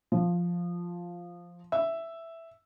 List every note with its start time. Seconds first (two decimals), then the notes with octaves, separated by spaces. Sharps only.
0.12 F3
1.72 E5